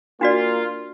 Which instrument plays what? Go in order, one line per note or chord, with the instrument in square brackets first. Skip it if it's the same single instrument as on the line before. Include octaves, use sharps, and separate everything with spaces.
[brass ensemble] A#3 F4 [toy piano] D4 F#4 D5